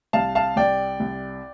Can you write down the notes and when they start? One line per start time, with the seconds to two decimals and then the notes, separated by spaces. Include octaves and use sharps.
0.13 C2 F5 A5
0.35 F5 A5
0.56 C2 D5 G5
1.00 C2